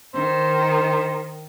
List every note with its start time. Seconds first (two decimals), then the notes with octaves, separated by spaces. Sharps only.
0.15 D#3 C5